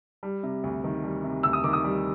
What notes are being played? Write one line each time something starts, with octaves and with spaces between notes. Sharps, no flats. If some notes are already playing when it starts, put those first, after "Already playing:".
G3
C3
D2
D#3
G3
C3
D2 E6
D#6
D#3 D6
D#6
G3